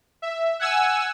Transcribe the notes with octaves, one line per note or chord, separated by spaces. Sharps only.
E5
F#5 G#5 E6